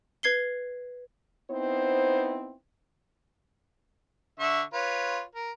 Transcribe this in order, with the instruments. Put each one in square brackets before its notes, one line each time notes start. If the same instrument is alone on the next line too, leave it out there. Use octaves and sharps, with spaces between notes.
[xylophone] B4 G#6 C7 G7
[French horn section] B3 C4 D#4 E4 C5
[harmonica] D3 E5 C#6
F4 B4 C#5
A#4